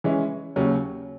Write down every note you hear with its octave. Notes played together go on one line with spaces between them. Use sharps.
E3 G#3 C#4 E4
D#2 C#3 F#3 C#4